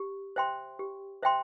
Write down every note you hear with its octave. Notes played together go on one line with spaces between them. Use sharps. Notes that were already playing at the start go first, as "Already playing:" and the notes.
Already playing: G4
C5 E5 G5 C6
G4
C5 E5 G5 C6